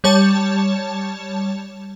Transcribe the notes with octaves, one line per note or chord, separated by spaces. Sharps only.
G3 C#5 A5